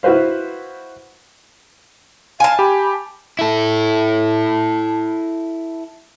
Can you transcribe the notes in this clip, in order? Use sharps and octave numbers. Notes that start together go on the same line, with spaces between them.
E4 F#4 B4 C5 F5
F5 G#5 A5
G4 B5
E4 A4